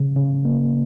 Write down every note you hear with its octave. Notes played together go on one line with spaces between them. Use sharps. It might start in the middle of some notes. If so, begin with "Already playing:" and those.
Already playing: C#3
C#3
A#3